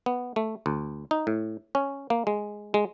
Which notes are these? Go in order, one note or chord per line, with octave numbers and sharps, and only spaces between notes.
B3
A3
D2
D#4
A2
C#4
A#3
G#3
G#3